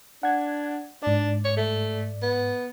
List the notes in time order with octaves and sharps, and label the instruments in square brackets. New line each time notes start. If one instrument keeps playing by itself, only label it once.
[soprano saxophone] D4 [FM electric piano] F#5 G#6
[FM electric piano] G#2 D5 [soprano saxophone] D4
[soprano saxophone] C#5
A3
B3